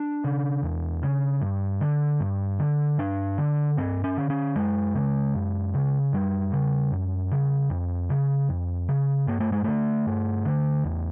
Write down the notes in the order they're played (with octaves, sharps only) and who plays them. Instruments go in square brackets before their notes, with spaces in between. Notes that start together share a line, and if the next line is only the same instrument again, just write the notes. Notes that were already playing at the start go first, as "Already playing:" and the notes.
Already playing: [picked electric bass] D4
C#3
E2
C#3
G2
D3
G2
D3
G2 D4
D3
G2 C4
C#4
D3
C#4
F#2 G#3
C#3
F#2
C#3
F#2 G3
C#3
F#2
C#3
F2
C#3
F2
C#3
G2 A#3
A3
G#3
D3 A3
G2
D3
E2